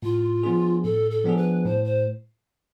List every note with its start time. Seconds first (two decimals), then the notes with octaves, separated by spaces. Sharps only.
0.02 A2 F4
0.43 F3 B3 D4 G#4
0.84 A2 A4
1.11 A4
1.24 F3 B3 D4 G#4
1.37 B4
1.65 A2 C5
1.84 C5